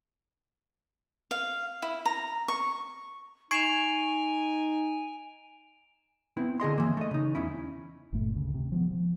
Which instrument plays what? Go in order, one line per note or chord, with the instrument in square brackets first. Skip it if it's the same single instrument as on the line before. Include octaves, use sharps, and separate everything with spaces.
[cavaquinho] F5
E4
A#5
C#6
[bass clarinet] D#4 [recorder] G#5 [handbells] C#6 G#6 C7 [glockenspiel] D7 E7 F7
[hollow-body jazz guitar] B3 C4 E4
D3 G#4 D#5 C6
E3 A#3
A3 D#5
C#3 D#4
E2 C#4 E4
[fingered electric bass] G1 G2 A#2 A3
D2 C#3
C3
F3 G#3 B3
F3